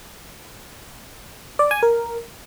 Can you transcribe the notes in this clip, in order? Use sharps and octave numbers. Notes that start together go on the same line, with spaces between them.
D5
G#5
A#4